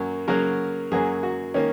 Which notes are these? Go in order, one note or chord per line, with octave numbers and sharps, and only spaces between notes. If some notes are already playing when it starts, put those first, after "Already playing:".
Already playing: F#2 F#3 A#3
C#3 F#3 A#3 A#4
F#2 F#3 A#3 G#4
F#4
D#3 A#3 C#4